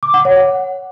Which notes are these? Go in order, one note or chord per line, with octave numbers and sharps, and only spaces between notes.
D6
F#5
C#5
F#5